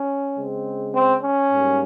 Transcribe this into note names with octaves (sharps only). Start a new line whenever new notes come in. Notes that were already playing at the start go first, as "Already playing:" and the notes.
Already playing: C#4
C#3 G#3 C4
C4
C#4
G#2 G3 A#3